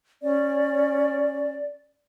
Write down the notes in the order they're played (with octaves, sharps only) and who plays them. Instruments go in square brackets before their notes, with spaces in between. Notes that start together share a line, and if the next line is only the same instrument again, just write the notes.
[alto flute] C#4 [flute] D5